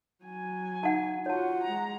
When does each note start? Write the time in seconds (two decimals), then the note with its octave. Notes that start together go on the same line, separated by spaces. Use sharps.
0.24 F#3 G#5
0.83 D#4 F#5 A5
1.26 F4 F#4 C#5 F#5 A5
1.64 G#3 A#5